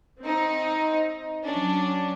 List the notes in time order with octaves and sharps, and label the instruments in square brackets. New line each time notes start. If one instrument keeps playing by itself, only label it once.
[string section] C4 D#4
F#3 C#4 D4